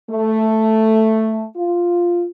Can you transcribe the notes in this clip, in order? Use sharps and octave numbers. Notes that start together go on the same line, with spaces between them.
A3
F4